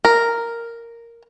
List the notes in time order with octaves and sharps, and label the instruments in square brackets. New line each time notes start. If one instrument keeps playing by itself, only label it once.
[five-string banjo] A#4